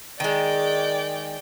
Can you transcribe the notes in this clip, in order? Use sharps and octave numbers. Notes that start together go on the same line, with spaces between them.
D#3 G#3 D5 G5